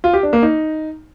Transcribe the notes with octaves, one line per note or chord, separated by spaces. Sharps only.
F4
G4
D4
A#3
D#4